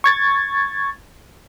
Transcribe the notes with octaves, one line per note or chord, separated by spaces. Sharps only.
C#6 G#6 A6